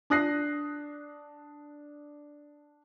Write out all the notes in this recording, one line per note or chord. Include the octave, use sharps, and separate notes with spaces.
D4 D#6 F#6 A#6 C7